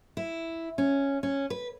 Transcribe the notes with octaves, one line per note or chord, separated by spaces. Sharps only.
E4
C#4
C#4
B4